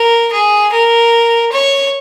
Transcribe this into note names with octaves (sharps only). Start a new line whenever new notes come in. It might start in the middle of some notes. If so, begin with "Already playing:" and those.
Already playing: A#4
G#4
A#4
C#5